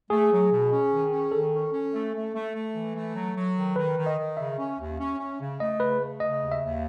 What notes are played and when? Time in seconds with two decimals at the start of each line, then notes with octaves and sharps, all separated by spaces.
0.10 A3 G#4
0.31 F#3
0.51 B2
0.71 C#4
0.91 D#3
1.11 C#4
1.32 D#3 A4
1.52 C#4
1.73 C#4
1.94 A3
2.14 A3
2.34 A3
2.55 A3
2.75 E3
2.95 A3
3.15 F#3
3.36 F#3
3.56 D#3
3.76 D#3 B4
3.97 D#3
4.06 D#5
4.17 D#3
4.37 C#3 E5
4.58 C#4
4.79 D#2
4.98 C#4
5.18 C#4
5.40 C#3
5.59 A3 D#5
5.80 C#3 B4
6.00 A3
6.20 C#3 D#5
6.42 D#2
6.51 E5
6.62 D#2